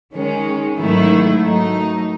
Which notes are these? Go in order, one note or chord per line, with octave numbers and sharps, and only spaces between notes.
D#3 G#3 C#4
G#2 D#3 F#3 A3 E4
F#3 A3 D#4